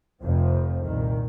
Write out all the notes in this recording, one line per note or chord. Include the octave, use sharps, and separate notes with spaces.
F1 F2 C3 F3
C2 A#2 D#3